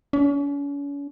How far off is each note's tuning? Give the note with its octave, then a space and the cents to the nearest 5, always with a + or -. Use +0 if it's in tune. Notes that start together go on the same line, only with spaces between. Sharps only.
C#4 +40